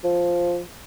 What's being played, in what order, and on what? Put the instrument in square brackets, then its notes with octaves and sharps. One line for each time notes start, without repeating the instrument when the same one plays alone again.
[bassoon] F3